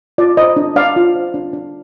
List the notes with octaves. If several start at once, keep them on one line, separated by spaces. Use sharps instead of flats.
F4 D5
C5 D#5
D4
D4 D5 F5
F4
C5
D4
D4